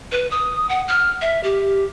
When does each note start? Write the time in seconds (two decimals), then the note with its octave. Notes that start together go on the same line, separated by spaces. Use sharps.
0.12 B4
0.31 D#6
0.69 F#5
0.88 F6
1.21 E5
1.44 G4